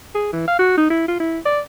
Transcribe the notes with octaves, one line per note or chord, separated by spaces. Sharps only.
G#4
E3
F5
F#4
D#4
E4
F4
E4
D5